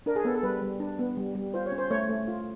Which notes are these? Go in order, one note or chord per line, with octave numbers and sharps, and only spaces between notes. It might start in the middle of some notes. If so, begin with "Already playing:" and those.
D4 A#4
G#4
B3 A4
A4
G3 B4
G3
D4
B3
G3
G3
F4 C5
C#5
C#4
C5
A3 C#5
A3
F4